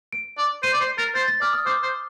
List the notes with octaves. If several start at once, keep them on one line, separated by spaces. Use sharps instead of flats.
D7
D5
C5 D#7
D5
C5 C7
A#4 A6
C5 A6
A6
D5 F6
D#6
C5 D6
C5